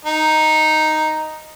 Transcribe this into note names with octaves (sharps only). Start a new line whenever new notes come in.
D#4